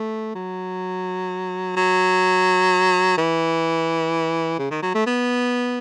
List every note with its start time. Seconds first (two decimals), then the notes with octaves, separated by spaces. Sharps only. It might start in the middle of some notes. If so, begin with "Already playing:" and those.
Already playing: A3
0.35 F#3
1.77 F#3
3.18 E3
4.59 C#3
4.71 D#3
4.83 F#3
4.95 A3
5.07 B3